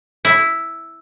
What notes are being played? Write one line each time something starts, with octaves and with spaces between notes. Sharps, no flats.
E4